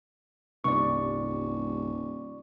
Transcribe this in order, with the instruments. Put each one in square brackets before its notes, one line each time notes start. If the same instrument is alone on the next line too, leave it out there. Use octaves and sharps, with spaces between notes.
[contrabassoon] D#1 [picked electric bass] C2 G2 C3 [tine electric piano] D5 C#6